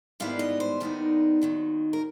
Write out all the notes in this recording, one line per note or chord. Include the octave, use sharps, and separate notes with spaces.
G#2 D#3 G3 B3 E4 F5
D#5
C5
D#2 D#3 G3 B3 D#4
D#2 D#3 F#3
A#4